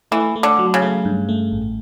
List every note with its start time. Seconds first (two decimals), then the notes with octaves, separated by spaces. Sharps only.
0.12 E3 A3
0.36 A3
0.43 D3
0.59 F#3
0.74 C#3
0.82 A3
1.05 G2
1.29 A3
1.52 A1